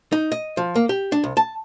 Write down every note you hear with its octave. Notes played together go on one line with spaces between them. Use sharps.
D#4
D#5
F3
A#3
G4
D4
C2
A5